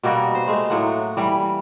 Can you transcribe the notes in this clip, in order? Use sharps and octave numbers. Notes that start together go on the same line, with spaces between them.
B2 G3 A#3 F#4
C5
G#3 A3
A2 F#3 A#3 F#5
E3 G3